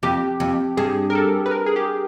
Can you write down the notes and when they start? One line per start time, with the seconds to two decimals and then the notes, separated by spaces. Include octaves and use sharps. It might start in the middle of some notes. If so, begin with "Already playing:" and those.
0.03 F2 G4
0.40 F2
0.77 G2 G#4
1.10 A#4
1.15 A4
1.46 B4
1.51 A#4
1.66 G#4
1.76 G4